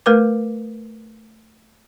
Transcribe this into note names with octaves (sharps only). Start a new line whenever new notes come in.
A3 A#4 B4 D6